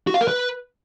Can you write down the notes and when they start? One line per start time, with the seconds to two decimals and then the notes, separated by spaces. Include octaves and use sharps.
0.07 F#4
0.14 F5
0.21 A#4
0.28 B4